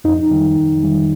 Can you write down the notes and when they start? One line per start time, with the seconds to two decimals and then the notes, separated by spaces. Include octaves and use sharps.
0.04 F2 D#4
0.31 D#3 G3
0.57 F2
0.84 D#3 G3